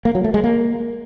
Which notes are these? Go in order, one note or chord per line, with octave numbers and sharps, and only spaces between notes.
A#3
F#3
A3
G#3
A#3